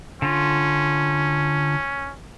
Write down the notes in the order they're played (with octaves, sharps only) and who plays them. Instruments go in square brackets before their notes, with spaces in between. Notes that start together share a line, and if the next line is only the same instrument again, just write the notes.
[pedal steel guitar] D3 F4 [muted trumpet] C#4